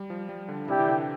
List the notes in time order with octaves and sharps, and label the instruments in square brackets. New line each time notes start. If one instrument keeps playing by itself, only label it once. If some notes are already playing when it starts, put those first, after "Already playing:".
Already playing: [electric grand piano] G3
F3
G3
D3
[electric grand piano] C3 [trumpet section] E4 G4 D5 G5
[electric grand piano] E3
D3